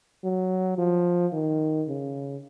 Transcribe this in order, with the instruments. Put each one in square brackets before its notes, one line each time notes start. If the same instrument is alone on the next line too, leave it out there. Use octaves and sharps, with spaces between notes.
[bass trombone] F#3
F3
D#3
C#3